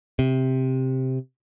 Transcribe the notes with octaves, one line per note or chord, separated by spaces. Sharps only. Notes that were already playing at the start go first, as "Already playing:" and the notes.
C3